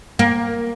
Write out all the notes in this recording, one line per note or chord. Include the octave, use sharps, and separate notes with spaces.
A#3